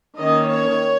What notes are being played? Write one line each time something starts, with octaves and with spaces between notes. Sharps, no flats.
D#3 A#3 C#4 D#5
C#5